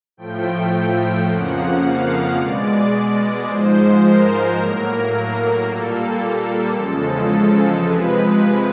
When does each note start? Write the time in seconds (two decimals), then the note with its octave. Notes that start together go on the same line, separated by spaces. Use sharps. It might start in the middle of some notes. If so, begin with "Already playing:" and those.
0.17 A2 F3 A3 G5
1.26 F2 C#3 F3 A#3 F#5
1.82 F5
2.36 B2 G#3 D5
3.45 G#2 F3 G#3 C5
4.00 A#4
4.54 A2 F#3 A#3 A#4
5.64 A#2 G3 A#3 A4
6.73 E2 C#3 F3 G#3 A4
7.28 A4
7.82 C3 F3 G#3 B4